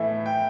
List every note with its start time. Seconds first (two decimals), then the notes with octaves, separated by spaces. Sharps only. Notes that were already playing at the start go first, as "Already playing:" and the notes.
Already playing: A2 E3 A3 E4 E5
0.26 G5